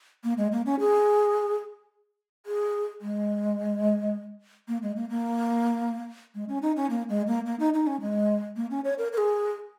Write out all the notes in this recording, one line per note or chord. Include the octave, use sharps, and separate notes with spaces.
A#3
G#3
A#3
C#4
G#4
G#4
G#3
A#3
G#3
A#3
A#3
G#3
C#4
D#4
C#4
A#3
G#3
A#3
A#3
D#4
D#4
C#4
G#3
A#3
C#4
C#5
A#4
A#4
G#4